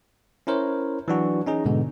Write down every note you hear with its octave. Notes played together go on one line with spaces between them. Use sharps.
C#4 E4 A#4 C5 C#5
E3 F#3 D4 F#4
C#4 D#4 G#4
G#2 B2 D3 G#3 B3